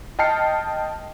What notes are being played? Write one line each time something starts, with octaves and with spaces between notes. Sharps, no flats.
D#5 G5 A5 F6 C7 C#7